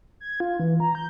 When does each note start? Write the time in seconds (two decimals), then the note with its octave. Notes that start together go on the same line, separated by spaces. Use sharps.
0.20 G#6
0.40 F4
0.60 E3
0.80 A#5
0.95 G6